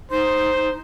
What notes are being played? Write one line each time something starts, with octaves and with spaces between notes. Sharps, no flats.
D#4 C5